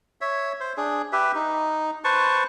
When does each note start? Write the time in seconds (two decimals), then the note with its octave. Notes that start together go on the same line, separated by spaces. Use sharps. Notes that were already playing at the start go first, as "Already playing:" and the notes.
0.21 C#5 E5
0.60 C5
0.77 D4 G#4
1.13 G4 B4 E5
1.35 D#4
2.04 B4 C5 A5 C#6